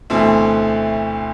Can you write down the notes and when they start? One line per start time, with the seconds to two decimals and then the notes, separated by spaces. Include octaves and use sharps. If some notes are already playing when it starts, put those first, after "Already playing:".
0.10 D2 B2 E3 A3 C4